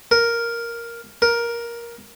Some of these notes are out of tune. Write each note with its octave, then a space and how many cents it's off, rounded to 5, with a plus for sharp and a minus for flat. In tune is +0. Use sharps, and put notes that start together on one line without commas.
A#4 +0
A#4 +10